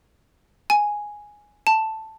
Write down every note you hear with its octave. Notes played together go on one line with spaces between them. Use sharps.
G#5
A5